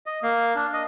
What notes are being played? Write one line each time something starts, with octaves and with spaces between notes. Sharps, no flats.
D#5
A#3
D4
D#5